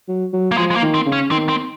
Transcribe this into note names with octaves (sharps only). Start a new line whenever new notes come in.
F#3
F#3
A#3
F3 G#3
G#3
A#3
D#3
C4
C#3
C#4
D#3 C4
C4